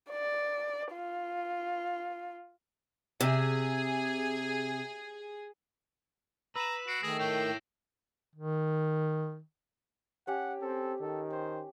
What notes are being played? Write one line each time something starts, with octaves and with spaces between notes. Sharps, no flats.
D5
F4
C3 G#4
B4 A#5 E6 E7
F#4 C7 D7
D#3 A3 G#4 A#6 E7
E4 C#5 G5
D#3
C#4 G4 F#5
C4 A4
D#3 A4
C5